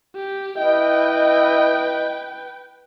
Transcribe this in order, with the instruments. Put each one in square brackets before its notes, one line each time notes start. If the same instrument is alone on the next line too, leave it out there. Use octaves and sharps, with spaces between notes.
[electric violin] G4
[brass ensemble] E4 D#5 [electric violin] B4 G5